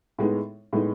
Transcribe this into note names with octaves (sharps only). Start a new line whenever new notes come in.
A2 G#3 B3 D#4
A2 G#3 B3 D#4